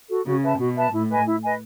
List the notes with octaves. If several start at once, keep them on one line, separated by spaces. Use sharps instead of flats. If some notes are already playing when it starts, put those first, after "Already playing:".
F#4 A4
C#3 F#4
B4 E5 A5
B2 F#4
B4 E5 A5
A2 E4
B4 D#5 G#5
E4
B4 D#5 G#5